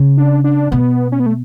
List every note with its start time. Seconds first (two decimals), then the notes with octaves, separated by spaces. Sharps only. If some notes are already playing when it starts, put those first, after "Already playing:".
Already playing: C#3
0.18 D4
0.44 D4
0.71 B2 B3
1.12 C#4
1.20 B3
1.26 A3